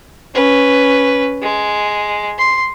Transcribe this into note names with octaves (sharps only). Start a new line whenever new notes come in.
C#4 B4
G#3
C6